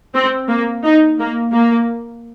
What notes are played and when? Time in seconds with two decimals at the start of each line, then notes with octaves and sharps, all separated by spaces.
0.15 C4
0.49 A#3
0.84 D#4
1.19 A#3
1.53 A#3